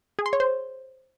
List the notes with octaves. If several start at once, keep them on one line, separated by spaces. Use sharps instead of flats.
G#4
C6
C#5
C5